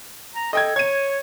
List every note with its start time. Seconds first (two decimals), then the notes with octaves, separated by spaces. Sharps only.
0.35 A#5
0.53 A4 D#5 G5 G#6
0.76 C#5 G#6 D#7